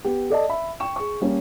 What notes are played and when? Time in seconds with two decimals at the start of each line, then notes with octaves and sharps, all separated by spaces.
0.05 B3 G4
0.30 A4 D5 D#5 A5
0.49 E5 B5
0.80 G5 C#6 E7
0.96 G#4 C#6
1.21 G3 A#3 C#4